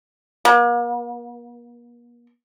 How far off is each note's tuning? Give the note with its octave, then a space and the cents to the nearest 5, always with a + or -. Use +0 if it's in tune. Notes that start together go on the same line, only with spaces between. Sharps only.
A#3 +40